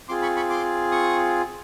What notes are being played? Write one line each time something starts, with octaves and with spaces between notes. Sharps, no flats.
C4 F4 G#4 C6 D6
B5 C#6
B5 C#6
C6 D6
C#6 D#6